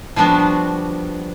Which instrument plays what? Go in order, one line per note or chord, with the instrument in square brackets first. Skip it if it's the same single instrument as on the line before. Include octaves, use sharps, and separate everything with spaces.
[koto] F3 G3 B3 D4 F#4